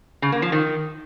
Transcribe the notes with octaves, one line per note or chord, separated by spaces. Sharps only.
C#3
A#3
F3
D#3